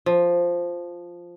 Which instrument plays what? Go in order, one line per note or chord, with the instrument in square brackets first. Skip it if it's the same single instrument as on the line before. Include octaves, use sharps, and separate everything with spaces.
[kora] F3